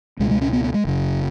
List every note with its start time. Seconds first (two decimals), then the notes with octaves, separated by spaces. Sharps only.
0.20 C#2 B2 G#3
0.31 G#3
0.41 C#4
0.53 B3
0.64 B3
0.74 G#3
0.85 F#1 F#2 C#3